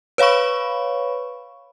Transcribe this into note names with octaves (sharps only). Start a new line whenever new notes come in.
B4 C#5 F5 B5 C#6